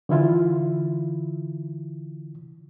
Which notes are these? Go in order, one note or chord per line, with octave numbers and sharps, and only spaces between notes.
D3 E3 E4 F4